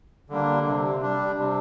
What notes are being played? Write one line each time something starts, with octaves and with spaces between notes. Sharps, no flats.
D3 G3 A#3 D4
C3
G3 D4
C3